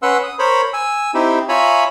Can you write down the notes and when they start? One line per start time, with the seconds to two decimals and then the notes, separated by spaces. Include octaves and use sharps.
0.02 C#4 B4 F#5 C6 E6
0.24 D#6
0.39 A#4 C5 C#5 B5
0.73 G#5 E6
1.14 C4 D#4 E4 G4
1.49 F4 C#5 E5 G#5 A#5 B5